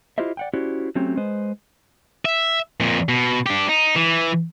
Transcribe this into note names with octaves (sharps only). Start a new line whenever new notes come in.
E4 F4 G4 C5 D#5 E5
D5 F#5 G5
C#4 E4 F#4 G4 C5 D5
F#3 A3 C4 C#4 G4
G#3 B4 C5 D#5
E5
F2 A#2
B2
D4 G4
D#4
E3